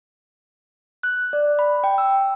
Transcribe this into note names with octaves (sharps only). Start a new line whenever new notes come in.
F#6
D5
B5
G5
E6